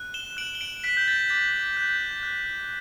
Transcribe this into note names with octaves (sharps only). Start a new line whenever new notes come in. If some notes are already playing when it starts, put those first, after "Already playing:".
Already playing: F#6
E7 G7
F#6 D7 F#7
G7
D7 F#7
F#6 B6 D7
G6
A6
D6 A6
F#6 G6
F#6